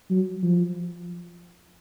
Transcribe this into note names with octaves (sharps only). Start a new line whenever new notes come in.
F#3
F3